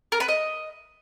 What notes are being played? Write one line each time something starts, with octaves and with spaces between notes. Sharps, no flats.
A#4
B4
D#5